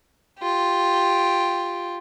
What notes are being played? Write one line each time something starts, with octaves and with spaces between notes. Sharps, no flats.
F4 G4